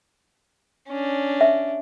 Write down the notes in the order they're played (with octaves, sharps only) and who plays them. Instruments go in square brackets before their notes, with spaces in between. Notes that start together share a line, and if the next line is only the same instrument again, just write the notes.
[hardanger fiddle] C#4 D4
[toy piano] E5